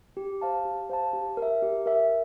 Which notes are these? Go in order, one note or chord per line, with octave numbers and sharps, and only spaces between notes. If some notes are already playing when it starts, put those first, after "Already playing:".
G4
C5 F5 A5
G4
C5 F5 A5
G4
A#4
E5
G4
A#4 E5